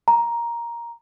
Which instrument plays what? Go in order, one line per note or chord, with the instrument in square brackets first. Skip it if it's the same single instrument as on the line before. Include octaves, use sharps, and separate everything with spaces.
[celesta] A#5